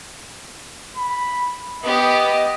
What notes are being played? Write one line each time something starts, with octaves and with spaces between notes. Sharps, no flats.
B5
B3 G4 D#5